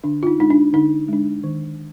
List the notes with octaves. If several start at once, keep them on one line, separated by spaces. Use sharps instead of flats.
D3 D4
F4
D#4
G#3 D4 D#4
D4
D3 D#4
G#3 D4
D#3